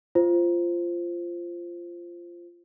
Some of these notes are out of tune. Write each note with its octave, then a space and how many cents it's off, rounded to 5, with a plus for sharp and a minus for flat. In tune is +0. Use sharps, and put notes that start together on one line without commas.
F4 -15 C5 +0